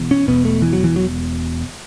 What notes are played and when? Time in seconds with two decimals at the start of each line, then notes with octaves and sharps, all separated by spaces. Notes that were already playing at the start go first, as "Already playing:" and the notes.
Already playing: E1 E2
0.11 C#4
0.28 E1 E2 B2 B3
0.45 A3
0.62 E3
0.73 F#3
0.84 E3
0.96 F#3